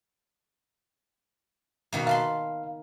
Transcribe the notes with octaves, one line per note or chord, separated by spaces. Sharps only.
B2 D#3 A#3
F5 A5 B5 C6